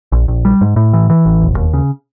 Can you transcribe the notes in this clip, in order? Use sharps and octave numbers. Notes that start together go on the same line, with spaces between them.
A#1
A#1
G3
G#2
A2
E3
E3
A1
E1
D#2
C#3